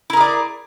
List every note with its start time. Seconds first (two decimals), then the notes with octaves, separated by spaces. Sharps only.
0.10 E4
0.13 A#4
0.17 G#4
0.21 D5